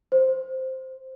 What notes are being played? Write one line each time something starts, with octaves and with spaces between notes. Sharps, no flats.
C5